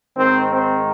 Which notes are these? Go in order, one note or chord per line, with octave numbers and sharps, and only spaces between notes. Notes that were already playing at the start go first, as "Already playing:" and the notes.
G#2 D#3 C4
C4